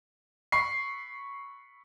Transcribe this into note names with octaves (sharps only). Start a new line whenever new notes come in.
B5 C#6 C7